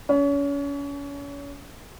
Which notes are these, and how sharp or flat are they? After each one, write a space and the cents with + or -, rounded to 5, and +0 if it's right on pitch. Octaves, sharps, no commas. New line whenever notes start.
C#4 +35